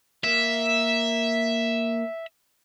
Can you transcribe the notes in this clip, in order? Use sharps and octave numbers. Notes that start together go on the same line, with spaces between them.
A#3 E5